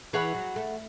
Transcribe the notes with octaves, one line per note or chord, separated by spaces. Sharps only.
E3 G#4 C#5 F#5 B5
F#3
A3